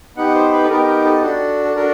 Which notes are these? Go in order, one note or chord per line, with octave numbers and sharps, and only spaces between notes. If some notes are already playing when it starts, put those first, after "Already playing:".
B3 D#4 G4 F#5
C5
B4
A4
B3 D#4 G4 A#4
A#4
A4
D4 F#4 A4
A4
D4 F#4 A4 A#4